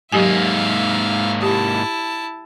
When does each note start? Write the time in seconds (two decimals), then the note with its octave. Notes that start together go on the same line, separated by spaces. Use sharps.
0.12 G#2 F#3 A#3 G4 E5 F5 G#5
1.42 E4 G4 A5